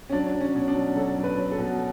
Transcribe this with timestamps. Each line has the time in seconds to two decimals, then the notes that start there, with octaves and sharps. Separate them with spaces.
0.10 C#4
0.12 F#3 D4
0.33 F#3
0.41 C#4
0.55 B2
0.68 D4
0.75 F#3
0.96 F#3 A4
1.17 F#3
1.24 B4
1.37 F#3
1.52 A4
1.58 B2